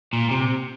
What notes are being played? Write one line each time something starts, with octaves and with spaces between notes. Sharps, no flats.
A#2
C3